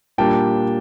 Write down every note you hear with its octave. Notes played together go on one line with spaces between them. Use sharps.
A#2 G3 A#3 D4 G5 A5